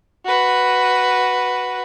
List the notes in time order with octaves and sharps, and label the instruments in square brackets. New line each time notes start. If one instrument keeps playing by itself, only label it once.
[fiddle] F#4 B4